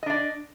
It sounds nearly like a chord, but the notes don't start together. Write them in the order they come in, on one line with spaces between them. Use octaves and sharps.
D#5 D4 D5